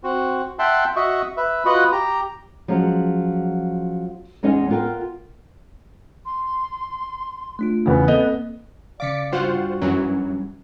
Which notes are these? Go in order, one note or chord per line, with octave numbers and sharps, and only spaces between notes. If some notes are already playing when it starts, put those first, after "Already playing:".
C4 F#4
E5 F#5 G5 A5 C6
F#4 D#5 E5 C#6
B4 E5
F4 F#4 B4 D#5 F#5
G4 A#5
F3 F#3 G#3 C#4
E2 G#3 C#4 D#4 D#5 G#5
B3 F4 A#4 G5
C6
A3 D4 F4
E2 C#3 B3
A#3 C4 A4 D#5
C#3 D5 F5 D6 B6 C#7
G2 F4 F#4 C5 F#5
F#2 E3 F#3 C#4